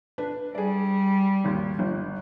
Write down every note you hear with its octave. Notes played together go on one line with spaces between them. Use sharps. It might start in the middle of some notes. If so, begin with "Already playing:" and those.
D4 B4
G3 G#4 D5
G#1 D#2
G1